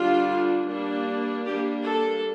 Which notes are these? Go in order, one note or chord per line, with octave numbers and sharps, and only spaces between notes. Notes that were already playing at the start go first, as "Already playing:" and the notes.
Already playing: D3 G3 D4 F4
G3 A#3 D4
G3 A#3 D4 G4
A4